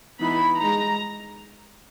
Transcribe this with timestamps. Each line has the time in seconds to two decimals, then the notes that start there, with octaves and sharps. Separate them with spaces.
0.20 E3 B3 D#4 B5
0.60 G#3 D#4 A#5